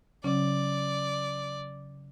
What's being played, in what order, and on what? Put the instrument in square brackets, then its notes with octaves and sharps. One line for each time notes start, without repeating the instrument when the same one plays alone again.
[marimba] C#3 F#3 C#4 [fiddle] D5